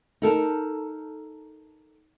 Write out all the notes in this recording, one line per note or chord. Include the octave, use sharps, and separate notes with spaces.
D#4 A4 A#4